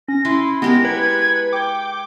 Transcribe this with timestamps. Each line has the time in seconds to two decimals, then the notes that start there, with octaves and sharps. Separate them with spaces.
0.08 C#4 A#6
0.25 E4 B4 C6
0.62 G#3 B3 G4 A#4 A#6
0.85 B4 G#6 C#7
1.53 G5 D6